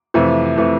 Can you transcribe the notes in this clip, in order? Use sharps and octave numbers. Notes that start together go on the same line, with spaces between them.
F2 C3 E3 A3
C3 E3 A3